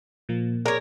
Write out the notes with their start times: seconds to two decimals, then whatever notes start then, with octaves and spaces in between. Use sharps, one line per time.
0.29 A#2 F3 A#3
0.66 G#4 A#4 C#5 D5